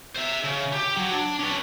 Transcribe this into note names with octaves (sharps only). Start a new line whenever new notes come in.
C5 E5
C#3
G4
F#3
D4
C#4 B4